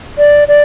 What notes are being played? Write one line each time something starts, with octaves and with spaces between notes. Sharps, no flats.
D5
D5